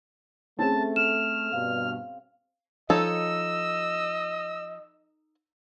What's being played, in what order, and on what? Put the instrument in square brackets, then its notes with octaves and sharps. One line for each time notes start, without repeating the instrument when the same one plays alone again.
[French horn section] A3 [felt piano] C4 C#4 G#4 [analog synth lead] A5
[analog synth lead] F6 [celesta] E7
[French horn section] G2 B2 [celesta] F5
[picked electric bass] F3 [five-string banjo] D#4 A4 C#5 [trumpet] D#5 [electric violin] E6